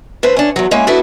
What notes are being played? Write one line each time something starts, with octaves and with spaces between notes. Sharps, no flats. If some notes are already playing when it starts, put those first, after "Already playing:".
D3 A3 B4 C5
C#4 D4
E2 F#3
G#3 A#3 C#4 E4
B3 D4 E4 F#4 A4 B4